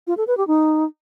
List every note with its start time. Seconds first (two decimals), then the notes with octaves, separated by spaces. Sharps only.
0.07 F4
0.17 A4
0.27 B4
0.37 G4
0.47 D#4